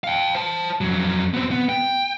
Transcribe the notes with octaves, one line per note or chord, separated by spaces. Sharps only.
F5 G5
C5 A5
F2 F#3
B3 C4
B3
G5